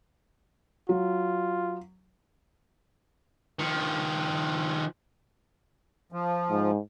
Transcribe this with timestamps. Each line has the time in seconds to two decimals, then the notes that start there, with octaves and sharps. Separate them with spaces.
0.89 F#3 F4
3.59 D#3 F3
6.12 F3
6.50 G#2